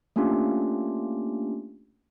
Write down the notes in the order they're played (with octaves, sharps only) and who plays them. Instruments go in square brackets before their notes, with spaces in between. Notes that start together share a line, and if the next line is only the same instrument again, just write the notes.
[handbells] A3 A#3 C#4 D4 F4 G4